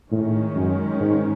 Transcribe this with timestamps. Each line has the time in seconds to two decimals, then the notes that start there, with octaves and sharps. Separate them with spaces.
0.11 A2 D#3 G#3 C#4
0.56 F#2
0.99 G#2